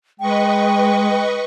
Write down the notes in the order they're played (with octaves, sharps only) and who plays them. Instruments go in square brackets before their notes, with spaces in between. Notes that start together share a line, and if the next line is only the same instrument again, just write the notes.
[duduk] G#3 [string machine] B4 D#5 C#6 [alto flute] G5